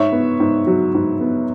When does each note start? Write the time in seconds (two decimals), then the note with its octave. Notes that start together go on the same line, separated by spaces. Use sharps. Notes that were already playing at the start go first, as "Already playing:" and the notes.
Already playing: G#2 C#5 E5
0.12 B3
0.40 G#2
0.67 F#3
0.94 G#2
1.21 B3